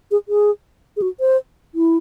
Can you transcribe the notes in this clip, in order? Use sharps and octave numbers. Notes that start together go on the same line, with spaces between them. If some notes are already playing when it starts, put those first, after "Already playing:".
G#4
G#4
G#4
F#4
C5
E4